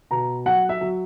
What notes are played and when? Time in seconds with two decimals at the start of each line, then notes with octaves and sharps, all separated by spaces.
0.11 B2 A#5
0.46 F#3 F#5
0.69 E5
0.81 F#3